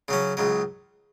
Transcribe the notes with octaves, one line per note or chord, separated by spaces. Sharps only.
C#3 F#3 C#4
C#2 C#3 F#3